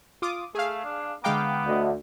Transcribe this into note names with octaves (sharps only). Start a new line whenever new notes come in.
F4 D6 D#6
A3 G#4 F5
D4
D3 G#3 B3 F5 G5 A#5 D6
D2 D#5 F#5